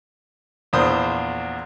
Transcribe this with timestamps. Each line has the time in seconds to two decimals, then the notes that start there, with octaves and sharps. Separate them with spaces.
0.73 A#1 E2 C5 D#6